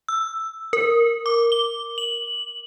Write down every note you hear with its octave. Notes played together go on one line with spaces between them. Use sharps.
E6
A#4
D6
G7
F#7